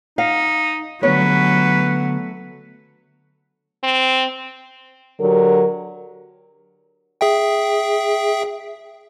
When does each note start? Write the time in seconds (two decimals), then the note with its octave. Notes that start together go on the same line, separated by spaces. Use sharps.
0.18 D#4 F5
1.03 D3 F#3 A3 B3 B4 C#5
3.84 C4
5.20 D3 F#3 G4 A#4
7.21 G#4 E5 G5